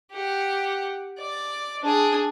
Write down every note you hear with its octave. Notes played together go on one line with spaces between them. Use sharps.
G4 F#5
D5
D4 G#4